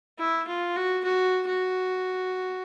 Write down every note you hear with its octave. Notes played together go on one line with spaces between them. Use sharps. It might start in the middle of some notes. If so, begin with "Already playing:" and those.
E4
F4
F#4
F#4
F#4